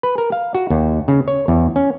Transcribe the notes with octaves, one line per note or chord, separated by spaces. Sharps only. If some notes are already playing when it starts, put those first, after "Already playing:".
B4
A#4
F5
F#4
D#2
C#3
C#5
E2
C#4